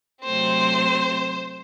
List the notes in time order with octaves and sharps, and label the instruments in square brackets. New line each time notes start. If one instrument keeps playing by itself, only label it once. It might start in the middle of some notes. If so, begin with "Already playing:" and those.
[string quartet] C3 F#3 A3 C4 C5